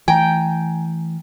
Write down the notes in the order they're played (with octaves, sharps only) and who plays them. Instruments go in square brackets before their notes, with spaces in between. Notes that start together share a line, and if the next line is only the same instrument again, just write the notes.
[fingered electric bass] E3 A3 [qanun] G5 [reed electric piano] G#5 A#5